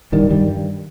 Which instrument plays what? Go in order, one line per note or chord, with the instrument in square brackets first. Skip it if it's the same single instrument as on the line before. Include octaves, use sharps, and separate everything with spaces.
[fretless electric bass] G2 D#3 G3
G2 D#3 G3
G2